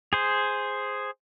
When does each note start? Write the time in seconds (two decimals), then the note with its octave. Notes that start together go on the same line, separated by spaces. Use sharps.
0.13 G#4 C5